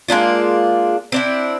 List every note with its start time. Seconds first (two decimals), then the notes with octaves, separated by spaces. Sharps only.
0.08 G#3 A#3 D4 F4
1.12 C4 D4 E4